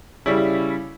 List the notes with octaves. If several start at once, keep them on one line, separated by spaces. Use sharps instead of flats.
C#3 G3 C#4 E4